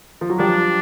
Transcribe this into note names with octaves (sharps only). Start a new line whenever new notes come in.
F3
F#3
F3 G3 D4